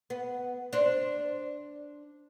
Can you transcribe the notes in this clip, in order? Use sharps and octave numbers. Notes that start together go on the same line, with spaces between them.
B3
D4 C5